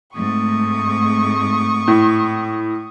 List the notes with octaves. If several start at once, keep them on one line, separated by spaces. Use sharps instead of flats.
G#2 A3 C4 C#6 D#6
A2